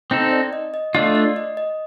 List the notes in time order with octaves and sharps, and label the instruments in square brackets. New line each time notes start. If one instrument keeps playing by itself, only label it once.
[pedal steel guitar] C4 D#4 A4 [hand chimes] C5
[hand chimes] D5
D#5
D#5
[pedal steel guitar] A3 D4 F4 [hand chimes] D#5
[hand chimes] D5
D#5
D#5